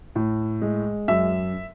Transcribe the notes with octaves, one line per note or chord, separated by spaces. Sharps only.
A2
G#3
F#2 E5